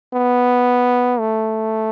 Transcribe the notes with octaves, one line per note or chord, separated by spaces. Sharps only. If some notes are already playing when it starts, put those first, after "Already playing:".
B3
A3